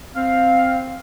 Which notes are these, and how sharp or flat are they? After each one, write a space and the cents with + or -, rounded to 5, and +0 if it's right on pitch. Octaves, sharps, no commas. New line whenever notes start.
C4 +0 F5 +5